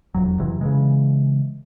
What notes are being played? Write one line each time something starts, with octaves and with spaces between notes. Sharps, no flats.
E1 F2 F#3
F2 C3 E3 F#3
C#3 E3 G#3